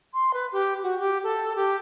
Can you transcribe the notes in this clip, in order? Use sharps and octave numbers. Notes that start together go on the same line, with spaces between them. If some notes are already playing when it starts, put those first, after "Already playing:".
C6
B4
G4
F#4
G4
A4
G4